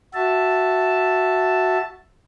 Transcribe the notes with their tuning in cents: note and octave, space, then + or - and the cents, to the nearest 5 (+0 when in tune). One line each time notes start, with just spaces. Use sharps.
F#4 +0 E5 +0 A5 +0